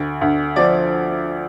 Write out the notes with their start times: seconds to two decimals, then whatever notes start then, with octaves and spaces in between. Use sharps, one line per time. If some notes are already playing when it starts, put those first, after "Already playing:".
Already playing: D2
0.21 D2
0.56 F3 D5